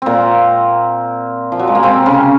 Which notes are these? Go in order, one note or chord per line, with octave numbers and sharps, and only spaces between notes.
A#2 A#3 C4
F3
F#3
G#3
A#3
C3 C4
C#3 C#4